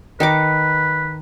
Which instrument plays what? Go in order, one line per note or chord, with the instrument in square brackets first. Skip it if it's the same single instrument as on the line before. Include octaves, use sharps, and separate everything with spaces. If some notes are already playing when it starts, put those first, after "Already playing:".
[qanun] D#3 D#4 D6 [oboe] B4